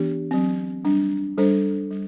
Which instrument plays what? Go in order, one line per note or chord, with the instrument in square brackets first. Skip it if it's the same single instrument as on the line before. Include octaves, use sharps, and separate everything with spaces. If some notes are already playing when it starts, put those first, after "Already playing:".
Already playing: [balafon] E3 B3 D4 G4
F#3 C4
G3 D4
G3 D4 A4 C5
G3